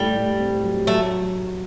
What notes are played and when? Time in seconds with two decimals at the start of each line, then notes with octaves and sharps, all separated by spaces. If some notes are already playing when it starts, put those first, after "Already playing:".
Already playing: A2 G3 A3 D#4
0.16 A2
0.40 C4
0.63 F#3
0.87 F#3 A3